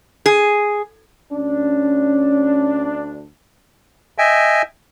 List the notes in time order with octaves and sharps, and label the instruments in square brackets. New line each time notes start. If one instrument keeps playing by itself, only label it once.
[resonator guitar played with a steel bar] G#4
[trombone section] D2 D4 [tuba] C#4
[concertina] D#5 E5 G5 G#5